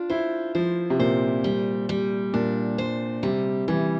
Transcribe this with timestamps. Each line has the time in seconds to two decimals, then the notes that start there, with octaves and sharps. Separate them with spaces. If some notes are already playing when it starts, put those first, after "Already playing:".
Already playing: D4 F4
0.10 E4 C5
0.55 F3 C5
0.90 C3
0.99 A#2 C5
1.44 G3
1.89 G3
2.34 A#2 D4
2.78 C5
3.23 C3 G3
3.68 E3 G3